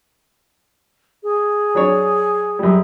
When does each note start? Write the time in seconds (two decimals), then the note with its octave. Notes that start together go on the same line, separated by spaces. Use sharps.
1.23 G#4
1.75 F#3 D4 C#5
2.59 F#2 G3